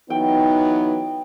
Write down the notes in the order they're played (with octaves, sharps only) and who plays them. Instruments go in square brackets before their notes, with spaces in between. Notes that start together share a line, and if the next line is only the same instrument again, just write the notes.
[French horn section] E3 F#3 B3 [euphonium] D#4 [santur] G5